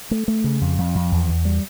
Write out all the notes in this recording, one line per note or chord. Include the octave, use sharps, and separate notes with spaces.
A3
A3
C#3
F2
F2
F2
E2
E2
G3